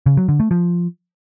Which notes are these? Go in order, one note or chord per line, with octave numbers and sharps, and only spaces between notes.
C#3
F#3
D3
A3
F3